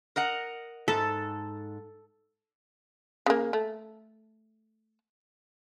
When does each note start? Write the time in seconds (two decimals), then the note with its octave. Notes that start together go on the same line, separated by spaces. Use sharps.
0.16 A#4 D#5 F#5
0.88 G#2 A4
3.26 C#3 A#3
3.53 A3